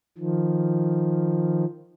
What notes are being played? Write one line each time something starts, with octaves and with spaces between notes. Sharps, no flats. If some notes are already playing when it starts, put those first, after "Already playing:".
D#3 F3